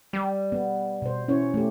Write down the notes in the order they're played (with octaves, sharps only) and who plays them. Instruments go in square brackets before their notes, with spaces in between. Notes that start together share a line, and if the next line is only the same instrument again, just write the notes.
[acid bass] G3
[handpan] B3
B2 C5
C#4 E4 C#5
A3 G4